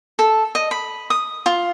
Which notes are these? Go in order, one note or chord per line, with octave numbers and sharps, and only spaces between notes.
A4
D#5
B5
D#6
F4